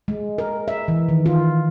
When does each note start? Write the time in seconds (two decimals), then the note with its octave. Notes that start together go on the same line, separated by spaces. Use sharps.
0.08 G#3
0.38 A#4
0.68 E5
0.88 E3
1.09 D#3
1.26 F4